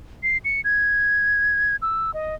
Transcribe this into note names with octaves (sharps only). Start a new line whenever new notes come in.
C7
C#7
G#6
E6
D#5